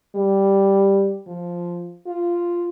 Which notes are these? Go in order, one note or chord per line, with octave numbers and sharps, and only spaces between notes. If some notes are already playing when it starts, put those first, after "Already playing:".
G3
F3
F4